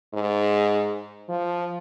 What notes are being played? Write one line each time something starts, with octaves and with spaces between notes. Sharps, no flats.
G#2
F3